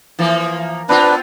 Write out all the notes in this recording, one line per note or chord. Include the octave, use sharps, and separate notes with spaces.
E3 F3 A#3
B3 C4 D4 F4 B4